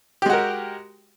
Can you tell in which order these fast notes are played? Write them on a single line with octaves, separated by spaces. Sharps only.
G4 G#3 F#4 A#4